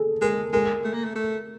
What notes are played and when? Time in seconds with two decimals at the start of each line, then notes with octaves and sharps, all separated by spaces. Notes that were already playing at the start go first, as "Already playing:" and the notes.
Already playing: G#4 A4
0.21 G#3 A#4
0.53 G#3 A#4
0.84 A3
0.94 A#3
1.04 A3
1.16 A3